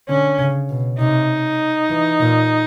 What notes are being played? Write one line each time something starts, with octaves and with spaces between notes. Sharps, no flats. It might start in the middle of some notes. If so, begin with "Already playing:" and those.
D3 C#4
C#3
B2
C3 D#4
E3
A#2